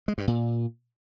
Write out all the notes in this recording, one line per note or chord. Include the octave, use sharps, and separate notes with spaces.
G#3
G2
A#2